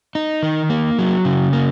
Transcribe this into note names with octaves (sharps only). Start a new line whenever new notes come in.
D#4
D#3
A#3
F#3
C#3
A#3